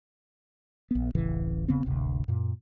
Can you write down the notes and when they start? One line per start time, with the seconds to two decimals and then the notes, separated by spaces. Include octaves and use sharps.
0.91 A#1 B3
1.15 D1 A1 C#3 E3
1.68 E1 C#3 B3 C4
1.84 D1 G#1 D2 C3
2.28 F#2 A#2